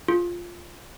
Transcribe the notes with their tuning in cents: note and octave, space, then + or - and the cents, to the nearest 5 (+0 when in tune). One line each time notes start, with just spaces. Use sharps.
F4 +0 G#4 +0